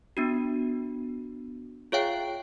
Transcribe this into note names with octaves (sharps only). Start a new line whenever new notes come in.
B3 D4 F#4
F4 G#4 C#5 E5 F5 G5